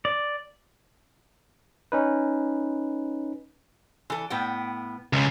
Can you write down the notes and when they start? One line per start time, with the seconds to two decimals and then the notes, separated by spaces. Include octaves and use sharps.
0.05 D5
1.92 C#4 D#4 B4
4.10 E3 A4
4.30 A2 B3 G5
5.13 C#2 C#3